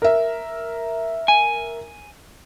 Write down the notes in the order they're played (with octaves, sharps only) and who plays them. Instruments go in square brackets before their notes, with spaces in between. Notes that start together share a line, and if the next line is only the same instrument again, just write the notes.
[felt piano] A#4 E5
[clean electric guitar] G#5